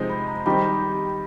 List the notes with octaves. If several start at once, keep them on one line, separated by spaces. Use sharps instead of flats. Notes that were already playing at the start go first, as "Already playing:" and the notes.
Already playing: C3 F3 G#3 C4 D#4
B5
A#5
D#3 G3 C4 D#4 G4 B5